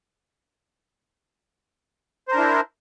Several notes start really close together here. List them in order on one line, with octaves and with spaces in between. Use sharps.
C5 A#4 D4 E4